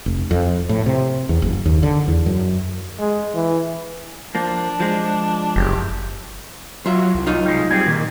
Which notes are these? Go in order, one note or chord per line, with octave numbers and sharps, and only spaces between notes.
F1
F2
A2
C3
E2
F#1
D#2
D3
E2
F#2
G#3
E3
F3 A#3 D4
F3 G#3
F#1 G4
F#3 F4 E5
C2
F#3 D#4 F4
G3 G#3
G3 C4 G#4
A#2 D#3